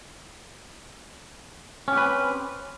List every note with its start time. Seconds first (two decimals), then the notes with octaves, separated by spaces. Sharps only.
1.88 C#4
1.93 G4
1.97 B4
2.02 C4